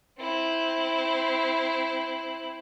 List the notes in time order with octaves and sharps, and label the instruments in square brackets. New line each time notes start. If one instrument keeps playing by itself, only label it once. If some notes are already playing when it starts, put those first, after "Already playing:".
[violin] C4 E4